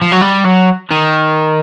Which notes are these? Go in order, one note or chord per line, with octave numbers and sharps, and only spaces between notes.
F3
F#3
G3
F#3
D#3